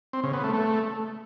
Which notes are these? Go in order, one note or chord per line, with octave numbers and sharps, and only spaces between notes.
C4
C#3
B3
A3
A3